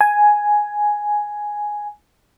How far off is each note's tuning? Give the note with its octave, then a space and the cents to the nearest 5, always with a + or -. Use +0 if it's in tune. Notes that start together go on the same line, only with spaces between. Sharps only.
G#5 +5